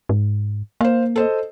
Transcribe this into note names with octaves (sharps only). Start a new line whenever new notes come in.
G#2
A#3 C5 F5
A4 C5 D#5